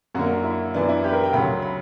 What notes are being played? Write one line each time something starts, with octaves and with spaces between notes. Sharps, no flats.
F#2 D3 A#3 F#4
E4
F#2 E3 B3 D4
E4
G4
B4
A#4
G5
D2 C#3 F#3 B5
B5